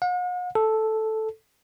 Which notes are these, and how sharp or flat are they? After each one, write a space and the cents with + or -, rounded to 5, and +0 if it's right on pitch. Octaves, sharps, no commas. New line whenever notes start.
F#5 -45
A4 -5